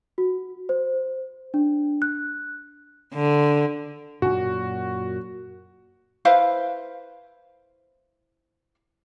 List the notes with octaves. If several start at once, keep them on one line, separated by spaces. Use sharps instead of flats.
F#4
C5
D4
F#6
D3
F#2 A#2 F#4
E4 B4 C5 F5